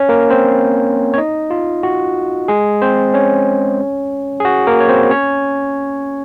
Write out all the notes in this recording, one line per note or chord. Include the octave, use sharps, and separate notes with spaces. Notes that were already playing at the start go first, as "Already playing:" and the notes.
Already playing: C#4 C#5
A#3 A#4
C4 C5
C#5
D#4 D#5
F4
F#4
G#3 G#4
C4 C5
C#4 C#5
G#4
F#4
A#3 A#4
C#5
C4 C5
C#4 C#5